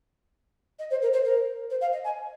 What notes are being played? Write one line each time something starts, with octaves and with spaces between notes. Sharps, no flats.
D#5
C5
A#4
C5
A#4
C5
F5
D#5
G#5